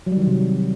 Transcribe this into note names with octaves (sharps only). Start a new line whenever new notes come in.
F#3
G3
D#3
F#3
C3